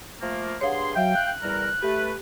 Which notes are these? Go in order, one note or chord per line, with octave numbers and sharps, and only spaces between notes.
F3 A3 A#3
G2 G#4 C#5 F5 F#5 C6
F#3 E5 F5 G5
F#6
E2 G3 A#4
A3 G4 B4